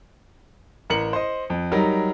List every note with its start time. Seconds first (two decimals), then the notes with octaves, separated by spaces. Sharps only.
0.90 A1 A#4 C#7 F#7
1.13 C5 D#5
1.50 F2
1.72 F#3 G3 D#4 A#4